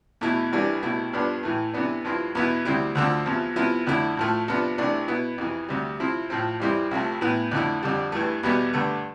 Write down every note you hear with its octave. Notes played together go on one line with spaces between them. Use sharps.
E2 B2 A3 E4
C2 C3 E3 G3 D4
C2 B2 A3 E4
G2 F3 B3 D4
A2 E3 A3
C3 E3 B3 D4
G2 F3 C4 E4
E2 B2 B3 E4
D2 C3 G3 C4 E4
D2 D3 F3 C4
E2 C3 F3
C3 F3 B3 E4
F2 D3 A3 E4
A2 F3 A3
C3 F3 B3 D4
C2 C3 E3 A3 D4
B2 B3 E4
F2 C3 E3
D2 C3 G3
C3 F3 C4 E4
A2 F3 A3 C4
F2 E3 G3 C4 E4
C2 C3 F3 A3
A2 E3 B3 E4
F2 D3 A3 E4
F2 D3 G3
G2 E3 A3
E2 B2 G3 B3
G2 D3 A3